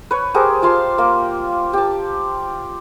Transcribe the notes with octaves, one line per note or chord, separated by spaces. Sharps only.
B4 C#5
G4 G#4 A#4 C5
F4 F5 A5 C6
A#3
G4 A5